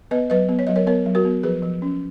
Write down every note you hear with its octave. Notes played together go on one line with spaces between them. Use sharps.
B3 B4 D#5
F#3 B4 D#5
B3
C#5
F#3 D#5
A#4 C#5
B3 A#4 C#5
F#3
F#4 A#4
B3
F3 G#4 B4
F3
C#4